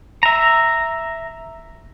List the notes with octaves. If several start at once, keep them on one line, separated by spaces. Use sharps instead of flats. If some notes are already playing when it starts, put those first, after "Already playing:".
E5 A#5